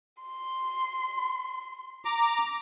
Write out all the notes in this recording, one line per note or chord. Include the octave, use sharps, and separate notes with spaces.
C6
A#5 D6